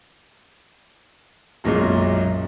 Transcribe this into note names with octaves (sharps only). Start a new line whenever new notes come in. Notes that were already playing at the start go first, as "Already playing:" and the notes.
B1 F#2 A#2 G#3